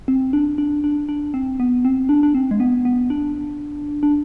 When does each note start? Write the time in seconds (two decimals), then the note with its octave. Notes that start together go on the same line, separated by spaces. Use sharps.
0.08 C4
0.33 D4
0.58 D4
0.84 D4
1.09 D4
1.34 C4
1.60 B3
1.85 C4
2.09 D4
2.23 D4
2.35 C4
2.51 G#3
2.60 B3
2.85 B3
3.10 D4
4.03 D4